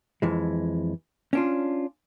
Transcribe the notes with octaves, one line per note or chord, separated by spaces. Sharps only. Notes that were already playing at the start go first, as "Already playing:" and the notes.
F2 E3 G#3
C#4 D4 F4